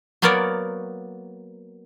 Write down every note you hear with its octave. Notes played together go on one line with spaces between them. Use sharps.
F#3 A#3 B3 A#4 C#5 D5